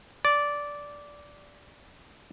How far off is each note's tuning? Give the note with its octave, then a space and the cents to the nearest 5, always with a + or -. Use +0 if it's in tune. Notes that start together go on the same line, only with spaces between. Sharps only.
D5 -10